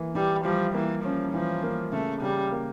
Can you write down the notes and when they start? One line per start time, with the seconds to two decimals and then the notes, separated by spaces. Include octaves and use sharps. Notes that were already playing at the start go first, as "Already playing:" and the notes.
Already playing: E3 A#3
0.15 E3 G3
0.45 F3 G3
0.74 E3 A#3
1.04 F3 C#4
1.34 E3 F3
1.63 A#3
1.92 C#3 A3
2.22 C#3 G3
2.52 A#3